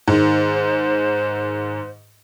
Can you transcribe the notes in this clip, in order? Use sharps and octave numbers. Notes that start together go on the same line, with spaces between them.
G#2 D#3 C5